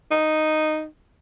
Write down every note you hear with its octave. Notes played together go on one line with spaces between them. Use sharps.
D#4